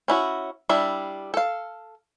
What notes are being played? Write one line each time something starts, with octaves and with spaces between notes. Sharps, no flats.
C#4 E4 F#4
G3 D4 E4 E5
A4 F5